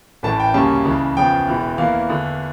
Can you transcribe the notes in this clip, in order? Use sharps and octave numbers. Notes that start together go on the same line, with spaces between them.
A1 A2 E3 A3 A5
G5
D2 C#3 G3 A#3 C#4 A5
C#2 C#3 E3
E2 C#3 F3 G5
E1 E2 E3
E2 E3 A#3 F5
E2 D3 A3